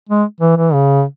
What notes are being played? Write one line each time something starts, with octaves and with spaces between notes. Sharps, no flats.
G#3
E3
E3
C#3